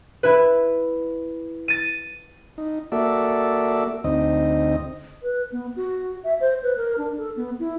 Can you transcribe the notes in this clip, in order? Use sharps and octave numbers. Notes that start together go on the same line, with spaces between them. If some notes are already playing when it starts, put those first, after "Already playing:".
E4 B4
A6 D#7
D#4
A#3 F#4 A4 D5 E5
D2 C4 D#4 D#5
B4
B3
F#4
E5
C5
B4
A#4
D4
A4
B3
E4